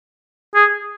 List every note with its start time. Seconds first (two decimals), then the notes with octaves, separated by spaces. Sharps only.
0.55 G#4